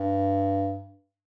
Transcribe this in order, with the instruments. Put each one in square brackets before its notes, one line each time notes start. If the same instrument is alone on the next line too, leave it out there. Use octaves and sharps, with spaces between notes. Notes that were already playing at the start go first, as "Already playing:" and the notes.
Already playing: [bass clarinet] G2